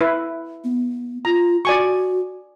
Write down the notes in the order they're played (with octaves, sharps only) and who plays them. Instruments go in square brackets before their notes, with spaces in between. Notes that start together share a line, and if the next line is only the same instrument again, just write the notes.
[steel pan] E4 B4
[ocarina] B3
[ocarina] F4 [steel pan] A#5
[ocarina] F#4 [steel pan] D5 G#5 C#6